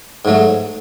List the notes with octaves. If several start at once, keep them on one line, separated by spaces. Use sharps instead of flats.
G#2 F#3 A3